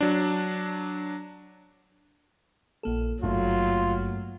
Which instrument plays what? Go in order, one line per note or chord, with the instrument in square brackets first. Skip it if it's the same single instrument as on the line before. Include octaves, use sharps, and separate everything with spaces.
[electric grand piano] F#3 D4
[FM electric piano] A#1 A#3 A4
[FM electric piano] G#1 [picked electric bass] G2 A3 A#3 [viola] F#3 [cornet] F4